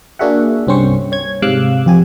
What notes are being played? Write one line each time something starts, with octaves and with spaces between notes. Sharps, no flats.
A#3 D4 F#4 G#4 E5 F#5
C2 G2 C4 C#4 C5 C#6
C#5 G#6
G#2 C3 F5 D6 E6 F#6
F2 G4 G#5